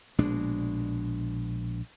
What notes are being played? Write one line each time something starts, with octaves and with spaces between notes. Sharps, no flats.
A#1 B2 G#3 D4